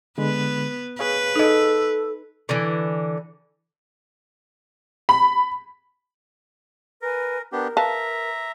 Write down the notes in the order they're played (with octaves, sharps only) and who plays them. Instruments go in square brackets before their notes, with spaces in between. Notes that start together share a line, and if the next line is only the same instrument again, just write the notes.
[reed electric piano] D3 G#3 B5 [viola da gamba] B3 B4
[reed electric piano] G#4 C#5 F5 [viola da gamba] B4
[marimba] D#4 D#5 [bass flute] A4
[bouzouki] D3 E3
[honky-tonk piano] B5
[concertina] A#4 [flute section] B4 G#5
[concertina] B3 D4 G4 [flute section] A#4
[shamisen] B4 F5 A5 [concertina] E5 A#5